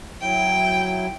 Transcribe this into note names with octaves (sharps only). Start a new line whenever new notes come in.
F#3 E4 G5